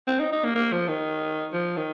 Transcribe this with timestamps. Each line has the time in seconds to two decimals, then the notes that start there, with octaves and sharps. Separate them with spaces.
0.07 C4
0.20 D#4
0.32 D#4
0.44 A#3
0.55 A#3
0.72 F3
0.88 D#3
1.53 F3
1.77 D#3